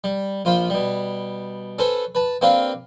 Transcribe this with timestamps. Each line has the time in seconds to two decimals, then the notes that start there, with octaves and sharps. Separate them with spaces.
0.04 G3
0.45 A#1 F4 C5 B5
0.70 B2 G3
1.78 C#4 A4 B4 C5
2.15 B4 A5
2.41 A#3 C4 D4 G4 B4 F5